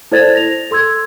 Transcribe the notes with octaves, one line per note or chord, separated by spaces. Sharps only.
E4 A4 C5 D5 G#6 A6
A#6 F7
A4 C6 E6 G#6